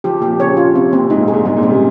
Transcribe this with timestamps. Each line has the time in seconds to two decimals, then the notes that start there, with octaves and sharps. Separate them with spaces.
0.04 F3 G4
0.20 A#2 G4
0.30 C3
0.40 C#3 C#5
0.57 F4
0.75 C3 C4
0.93 A#2 C4
1.10 G#2 D#4
1.22 G#2
1.28 G#4
1.34 A#2
1.45 G#2 G3
1.57 A#2
1.63 C#3 C4
1.69 C3